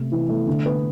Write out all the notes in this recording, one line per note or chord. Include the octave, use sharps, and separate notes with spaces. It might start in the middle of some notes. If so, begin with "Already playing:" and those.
Already playing: C3 A3
E3
A3
D3
B3